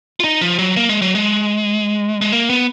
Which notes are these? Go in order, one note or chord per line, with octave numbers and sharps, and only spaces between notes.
F4
D#4
F3
F#3
A#3
G#3
F#3
G#3
G#3
A#3
B3